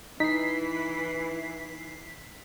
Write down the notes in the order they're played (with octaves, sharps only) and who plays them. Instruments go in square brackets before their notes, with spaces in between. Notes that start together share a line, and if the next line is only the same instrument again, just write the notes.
[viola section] E3 [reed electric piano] D#4 [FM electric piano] B6 C7